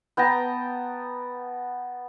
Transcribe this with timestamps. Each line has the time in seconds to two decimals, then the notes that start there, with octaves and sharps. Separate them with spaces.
0.17 B3 G5 A5 A#5